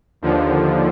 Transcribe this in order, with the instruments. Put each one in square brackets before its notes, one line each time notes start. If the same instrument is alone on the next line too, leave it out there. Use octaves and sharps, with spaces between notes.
[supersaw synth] D#2 D3 F3